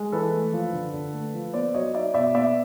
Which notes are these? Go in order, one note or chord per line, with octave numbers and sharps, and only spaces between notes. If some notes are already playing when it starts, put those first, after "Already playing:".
Already playing: G#3
E3 A4 B4
A3
F3
D3
D3
A3
F3
B3 C5 D5
F#3 C#5 D#5
D#4 D5 E5
B2 D5 E5
B3 D5 E5